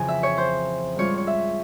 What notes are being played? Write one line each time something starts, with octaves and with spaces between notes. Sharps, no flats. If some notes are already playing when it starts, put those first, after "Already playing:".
Already playing: F2 C#3 E3 G#5
E5
C#5
C5
G#2 G3 C#4 F4 C#5
C#5
E5